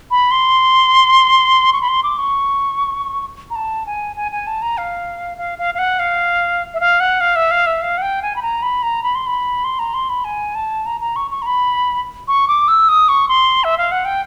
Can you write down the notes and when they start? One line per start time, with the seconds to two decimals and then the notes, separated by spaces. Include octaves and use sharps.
0.11 B5
0.31 C6
1.73 C#6
1.81 B5
1.88 C6
2.03 D6
2.18 C#6
3.50 A#5
3.56 A5
3.86 G#5
4.16 G#5
4.32 G#5
4.47 A5
4.62 A#5
4.78 F5
5.38 F5
5.59 F5
5.75 F5
5.79 F#5
5.99 F5
6.74 E5
6.80 F5
7.00 F#5
7.21 F5
7.36 E5
7.51 F5
7.66 E5
7.82 F5
7.98 F#5
8.02 G5
8.22 G#5
8.36 B5
8.42 A#5
8.62 B5
8.83 A#5
9.03 B5
9.15 C6
9.27 B5
9.64 C6
9.79 A#5
9.94 C6
10.09 B5
10.25 G#5
10.55 A5
10.86 A#5
11.01 A#5
11.16 C#6
11.31 C#6
11.42 A#5
11.46 B5
12.28 C#6
12.48 D6
12.68 E6
12.89 D#6
13.09 C#6
13.29 C6
13.64 E5
13.78 F5
13.92 F#5
14.05 G5